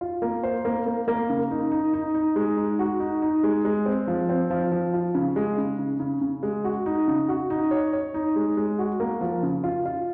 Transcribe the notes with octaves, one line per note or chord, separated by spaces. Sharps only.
F4
A#3
C5
A#3
A#3
A#3
C#3
D#4
D#4
D#4
D#4
G#3
D#4
F#4
D#4
D#4
G#3
G#3
C4
F3
C4
F3
F3
F4
C#3
G#3
C#3
C#3
C#3
C#3
G#3
F#4
D#4
C#3
F#4
D#4
C#5
C#5
D#4
G#3
G#3
F#4
A#3
F3
C#3
F4
F4